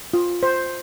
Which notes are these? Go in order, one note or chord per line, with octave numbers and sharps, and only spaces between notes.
F4
C5